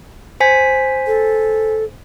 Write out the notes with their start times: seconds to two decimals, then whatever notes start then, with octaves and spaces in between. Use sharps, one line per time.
0.40 C5 G#5 B6
1.07 A4